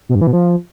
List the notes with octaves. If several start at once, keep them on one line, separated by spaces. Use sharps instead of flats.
B2
G2
E3
B2
F3